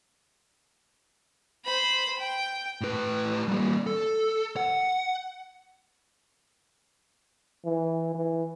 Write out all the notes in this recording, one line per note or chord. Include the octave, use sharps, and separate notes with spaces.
C5 B5
G5
A2 B4
G3 A#3
A4
F#5
E3
E3